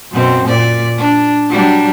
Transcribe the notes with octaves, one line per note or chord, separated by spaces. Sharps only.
F#2 B2 C4
A#2 D5
D4
F#3 G3 D4